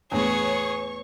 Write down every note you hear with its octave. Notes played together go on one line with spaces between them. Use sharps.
E2 A2 B3 G#4 C#5 C#6